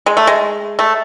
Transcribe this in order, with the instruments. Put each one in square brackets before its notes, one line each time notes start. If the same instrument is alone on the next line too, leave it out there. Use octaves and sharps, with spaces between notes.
[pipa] G#3
A3
G#3
A3